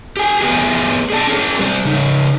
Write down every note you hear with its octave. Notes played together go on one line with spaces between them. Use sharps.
G4 G#5
B3 G4 G#4 A#4 B4 G#5
G#4 D5 A5
C#4 G#4 A#4
G3 G4 C5 D5
C#3 D#4